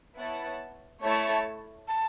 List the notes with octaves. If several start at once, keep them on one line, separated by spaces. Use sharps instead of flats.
B3 E4 C#5 F#5 A5
A3 E4 C#5 A5
A5